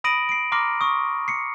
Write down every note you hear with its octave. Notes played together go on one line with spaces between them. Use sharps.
B5 D#6 A#6 D7 D#7 F#7
C7 D7
A#5 C6 D6 F6 A#6 C7
C#6 D#6
C7 C#7